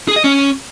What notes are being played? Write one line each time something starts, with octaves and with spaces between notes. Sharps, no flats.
G#4
D#5
C#4